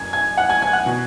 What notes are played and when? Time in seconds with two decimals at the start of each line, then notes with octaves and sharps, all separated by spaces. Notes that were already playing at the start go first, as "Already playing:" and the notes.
Already playing: F#2 G#5 G#6
0.13 G#5 G#6
0.37 F#5 F#6
0.49 G#5 G#6
0.62 G#5 G#6
0.73 F#5 F#6
0.86 B2